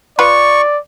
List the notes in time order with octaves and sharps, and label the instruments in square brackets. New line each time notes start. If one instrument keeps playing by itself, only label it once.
[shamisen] F4 B4 [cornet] D5 [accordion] C#6